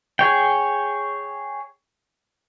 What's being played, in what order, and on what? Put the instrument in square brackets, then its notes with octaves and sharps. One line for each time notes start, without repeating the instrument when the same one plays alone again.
[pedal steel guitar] G#4 C#5 G5